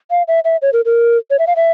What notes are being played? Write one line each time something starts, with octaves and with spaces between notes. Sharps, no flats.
F5
E5
E5
C#5
A#4
A#4
C#5
E5
F5
E5